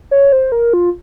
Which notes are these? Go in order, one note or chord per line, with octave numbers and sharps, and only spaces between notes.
C#5
C5
A#4
F4